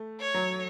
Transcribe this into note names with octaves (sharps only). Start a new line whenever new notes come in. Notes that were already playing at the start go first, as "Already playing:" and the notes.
Already playing: A3
C#5
F#3